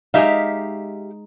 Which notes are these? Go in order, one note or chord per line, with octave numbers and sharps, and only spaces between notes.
G#3 D#4 G4 E5 F5